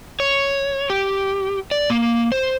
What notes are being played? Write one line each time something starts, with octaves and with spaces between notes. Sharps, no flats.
C#5
G4
D5
A#3
C5